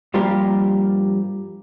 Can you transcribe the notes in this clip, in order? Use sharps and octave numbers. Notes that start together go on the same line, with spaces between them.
G2 F3 G3 A#3 G4 A#4